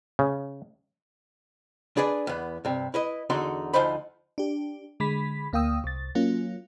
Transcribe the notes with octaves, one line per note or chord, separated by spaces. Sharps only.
C#3
D4 G#4 B4 D5
E2 B3
G2 C3
E4 B4 D#5
E2 D3 D#4 F#4 C6
D2 F3 D#4 C5 B5
D4 G4
D3 G#3 B5 B6
D2 A#3 F5 G5 D#6 E6
C2 A6
F#3 A#3 C#4 F4